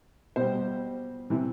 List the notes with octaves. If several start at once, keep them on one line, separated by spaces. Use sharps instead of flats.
B2 G3 C5
C3 E3